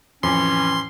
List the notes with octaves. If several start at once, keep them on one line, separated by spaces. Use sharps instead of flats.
F2 A2 E3 C#4 C6